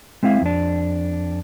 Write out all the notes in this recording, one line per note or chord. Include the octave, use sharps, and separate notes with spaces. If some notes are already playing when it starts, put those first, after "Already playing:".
G#3 C4 E4 F5
F2 D4